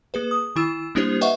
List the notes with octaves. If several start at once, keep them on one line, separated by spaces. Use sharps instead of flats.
A#3 G#4 B4
D#6
D#3 E4 E6 E7
G3 A#3 D4 E4 G4 C5
B4 D#5 E5 F#5 C#6